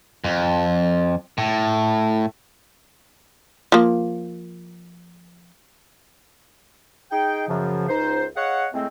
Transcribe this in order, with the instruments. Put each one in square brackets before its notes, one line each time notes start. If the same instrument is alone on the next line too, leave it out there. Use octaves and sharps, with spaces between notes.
[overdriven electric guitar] F2
A2
[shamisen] F3 A#3
[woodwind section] D#4 G#4 G5
F#2 C#3 F3
C#2 D#4 C5
G#4 C#5 D#5 F5 F#5
A2 G#3 A3 C4